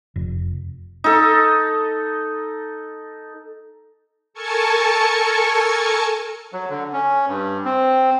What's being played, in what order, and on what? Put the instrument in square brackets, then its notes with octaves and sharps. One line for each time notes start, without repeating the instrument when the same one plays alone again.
[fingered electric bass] F1
[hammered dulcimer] D#4 A4
[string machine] A4 A#4 G#5 A5 C#6 C#7
[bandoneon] F#3
D3
C#4
G2
C4